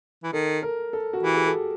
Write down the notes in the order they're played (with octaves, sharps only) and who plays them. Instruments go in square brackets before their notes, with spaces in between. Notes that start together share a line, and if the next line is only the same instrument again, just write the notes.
[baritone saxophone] E3
[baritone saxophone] D#3 [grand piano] A4
[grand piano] A#4
A4
F#4
[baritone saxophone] E3 [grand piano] G4
[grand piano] G#4
A4